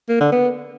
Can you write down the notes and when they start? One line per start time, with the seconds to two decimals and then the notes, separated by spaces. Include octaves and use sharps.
0.09 A#3
0.20 D3
0.32 B3